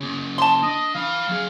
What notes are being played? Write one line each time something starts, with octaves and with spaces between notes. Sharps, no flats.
C#3 A#3
A5 C6
D4 D#5
E3 F5 B5
F#3 G#4